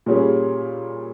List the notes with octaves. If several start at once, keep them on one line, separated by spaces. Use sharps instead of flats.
A#2 G3 C#4 G#4